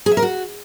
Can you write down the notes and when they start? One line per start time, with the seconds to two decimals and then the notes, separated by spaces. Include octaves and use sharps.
0.06 G#4
0.12 E5
0.17 A#4
0.22 F#4